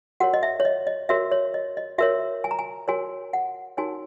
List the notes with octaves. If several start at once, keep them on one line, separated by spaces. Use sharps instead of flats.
F#4 A#4 C#5 F#5
D#5
E5
C#5
D#5
D#5
F#4 A#4 C#5 E5
C#5
D#5
D#5
F#4 A#4 C#5 E5
G#5
A#5
G#5
F#4 A#4 C#5 G#5
F#5
D#4 F#4 A#4 C#5 G#5